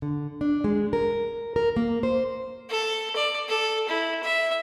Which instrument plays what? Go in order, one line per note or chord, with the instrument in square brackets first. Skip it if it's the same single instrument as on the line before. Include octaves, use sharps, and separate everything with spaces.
[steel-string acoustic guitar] D3
D4
G#3
A#4
A#4
A#3
C5
[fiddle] A4
D5
A4
E4
E5